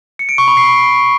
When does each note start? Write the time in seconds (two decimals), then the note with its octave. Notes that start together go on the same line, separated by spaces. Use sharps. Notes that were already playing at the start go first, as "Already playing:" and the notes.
0.19 C#7
0.29 D7
0.38 C#6
0.48 B5
0.57 C7